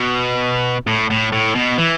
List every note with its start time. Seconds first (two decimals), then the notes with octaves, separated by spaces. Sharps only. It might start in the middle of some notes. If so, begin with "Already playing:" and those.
Already playing: B2
0.87 A2
1.10 A2
1.32 A2
1.55 B2
1.78 E3